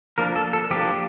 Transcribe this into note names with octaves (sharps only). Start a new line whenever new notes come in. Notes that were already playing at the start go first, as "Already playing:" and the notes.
F3 A#3 D4 A#4
A4
A4
F3 A#3 D4 G4